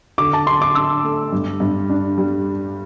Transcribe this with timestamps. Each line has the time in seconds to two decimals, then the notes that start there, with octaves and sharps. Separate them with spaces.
0.18 D3 D6
0.33 A5
0.47 D3 C6
0.62 D6
0.75 D4 E6
1.04 A3
1.32 G2
1.60 G2
1.90 D4
2.18 G3